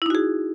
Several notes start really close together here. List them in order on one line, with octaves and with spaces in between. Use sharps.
E4 D#4 F#4 G#4